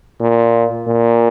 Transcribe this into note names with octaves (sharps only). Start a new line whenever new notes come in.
A#2
A#2